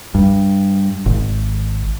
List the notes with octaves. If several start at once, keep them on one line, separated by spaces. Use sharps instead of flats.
G2
G#1